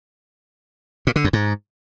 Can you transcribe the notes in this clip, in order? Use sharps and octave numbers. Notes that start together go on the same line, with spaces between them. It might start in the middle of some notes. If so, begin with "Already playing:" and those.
A#2
D3
F#2
G#2